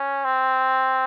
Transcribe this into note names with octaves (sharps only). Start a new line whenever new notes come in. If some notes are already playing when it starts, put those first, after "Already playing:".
Already playing: C#4
C4